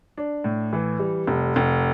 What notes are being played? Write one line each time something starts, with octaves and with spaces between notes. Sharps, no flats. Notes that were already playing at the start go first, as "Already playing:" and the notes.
D4
A2
E3
G3
F1
F1